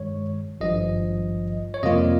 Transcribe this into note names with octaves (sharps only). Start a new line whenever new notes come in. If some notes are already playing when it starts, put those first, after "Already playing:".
Already playing: G2 D#3 G#3 C#5
G#1 G2 F3 D#5
C#5
F2 C3 G3 A#3 F4 D#5